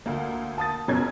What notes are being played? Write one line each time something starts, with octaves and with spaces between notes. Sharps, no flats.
D2 A#3
A5 D#6 A6
F#1 B2 C#4 G#6